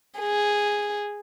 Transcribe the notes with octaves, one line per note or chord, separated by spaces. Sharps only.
G#4